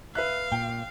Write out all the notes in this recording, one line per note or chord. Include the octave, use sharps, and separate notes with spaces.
B4 E5 F5 F#6
A#2 G5